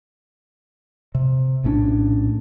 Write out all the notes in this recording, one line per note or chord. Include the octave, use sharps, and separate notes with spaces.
C3
A#1 A2 C#4 D4